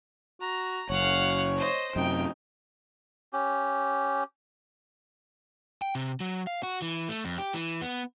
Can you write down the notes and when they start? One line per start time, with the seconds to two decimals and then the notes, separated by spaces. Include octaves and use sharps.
0.41 F#4 A#5
0.90 F#1 C#5 F5 F#5
1.57 C5 D#5
1.96 F#2 C3 D#4 G5
3.33 C#4 G4
5.82 G5
5.95 C3
6.20 F#3
6.47 F5
6.63 F#4
6.82 E3
7.08 A3
7.25 F2
7.38 G4
7.54 E3
7.82 B3